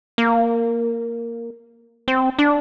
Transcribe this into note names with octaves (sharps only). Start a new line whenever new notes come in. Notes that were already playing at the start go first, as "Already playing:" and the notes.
A#3
C4
D4